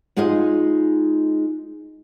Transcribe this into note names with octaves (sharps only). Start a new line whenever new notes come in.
G#3 D#4 F4 G#4 D#5